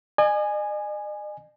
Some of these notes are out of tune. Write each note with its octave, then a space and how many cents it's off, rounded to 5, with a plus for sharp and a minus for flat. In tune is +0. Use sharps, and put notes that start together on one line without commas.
D#5 -45 G#5 +0